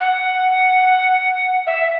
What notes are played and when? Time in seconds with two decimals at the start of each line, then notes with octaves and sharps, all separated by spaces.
0.01 F#5
1.67 E5